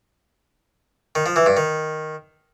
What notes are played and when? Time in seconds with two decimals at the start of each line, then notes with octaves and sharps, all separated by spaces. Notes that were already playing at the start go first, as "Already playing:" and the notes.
1.15 D#3
1.26 F3
1.36 E3
1.46 G2
1.57 D#3